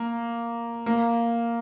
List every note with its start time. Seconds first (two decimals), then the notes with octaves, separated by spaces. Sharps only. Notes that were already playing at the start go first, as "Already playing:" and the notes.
Already playing: A#3
0.86 A#3